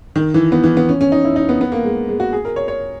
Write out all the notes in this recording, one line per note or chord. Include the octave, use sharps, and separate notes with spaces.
D#3
E3
B3
E3
B3
C#4
C#4
D#4
E4
D#4
B3
B3
A#3
G#3
G#3
F#4
G#4
A#4
C#5
C#5